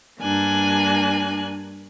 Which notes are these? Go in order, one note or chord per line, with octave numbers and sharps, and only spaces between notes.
G2 A#3 D4 G#5 F#6